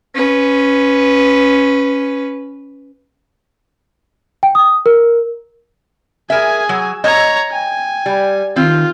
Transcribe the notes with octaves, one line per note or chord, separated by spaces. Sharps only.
C#4 B4
G5
D#6
A#4
G#4 A#4 E5 G#5
F#3 E6
C#5 D#5 A#5
G5 G#5
G3
D#3 C4 F4